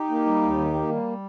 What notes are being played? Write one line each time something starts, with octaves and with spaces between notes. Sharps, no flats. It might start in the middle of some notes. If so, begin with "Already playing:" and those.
Already playing: D#4 G4
A#3
G3
D#2
D#3
A#3
G3